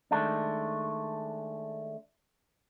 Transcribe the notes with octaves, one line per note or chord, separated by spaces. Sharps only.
D#3 G#3 A3 D4